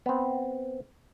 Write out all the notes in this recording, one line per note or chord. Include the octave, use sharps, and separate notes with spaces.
B3 C4